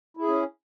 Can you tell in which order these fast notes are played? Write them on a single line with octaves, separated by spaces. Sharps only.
E4 G#4 C#4